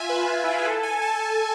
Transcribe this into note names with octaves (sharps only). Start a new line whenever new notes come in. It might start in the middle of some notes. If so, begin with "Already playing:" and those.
Already playing: F4 E5 G#5
B4
E4
F4
G#4
A4
G#5
A5